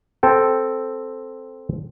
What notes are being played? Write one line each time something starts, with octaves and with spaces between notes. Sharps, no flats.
C4 A4 G5